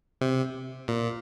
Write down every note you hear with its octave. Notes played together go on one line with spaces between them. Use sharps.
C3
A#2